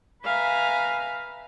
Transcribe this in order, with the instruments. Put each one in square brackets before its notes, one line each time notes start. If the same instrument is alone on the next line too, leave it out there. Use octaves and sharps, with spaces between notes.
[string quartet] B4 E5 F5 G#5 A#5